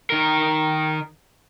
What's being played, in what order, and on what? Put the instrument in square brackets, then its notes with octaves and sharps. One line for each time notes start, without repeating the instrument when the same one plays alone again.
[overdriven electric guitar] D#3 A#4